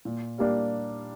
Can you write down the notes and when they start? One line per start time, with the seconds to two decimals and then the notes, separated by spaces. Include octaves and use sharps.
0.05 A#2
0.38 G3 A#3 D4